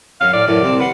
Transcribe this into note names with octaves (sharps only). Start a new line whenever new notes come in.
F#2 C#4 F5
A2 D5
F#2 A2 E3 D5
C2 C4 A5
B4 F#5 C6